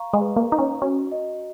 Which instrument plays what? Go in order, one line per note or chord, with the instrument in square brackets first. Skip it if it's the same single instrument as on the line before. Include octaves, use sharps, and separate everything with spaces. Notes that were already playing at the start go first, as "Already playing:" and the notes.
Already playing: [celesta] F5 A#5 C#6
[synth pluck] G#3
[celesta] B4
[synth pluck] A#3
[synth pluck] D#4 [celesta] A#5
[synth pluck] C#4
[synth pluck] C#4 [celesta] F#4
[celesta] D#5